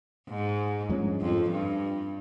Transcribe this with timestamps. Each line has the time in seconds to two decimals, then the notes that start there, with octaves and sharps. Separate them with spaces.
0.29 G#2
0.89 G2 F3 G#3 C#4
1.21 F2
1.51 G2